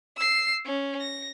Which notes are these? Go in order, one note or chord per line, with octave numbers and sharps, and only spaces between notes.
E6 C7
C#4
A#6